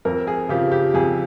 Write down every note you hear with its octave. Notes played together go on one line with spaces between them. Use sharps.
F2 A#4
G#4
C#3 F3 G4
G4
F2 G#4